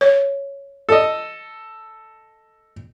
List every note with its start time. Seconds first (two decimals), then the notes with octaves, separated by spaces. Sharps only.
0.01 C#5
0.89 A4 D#5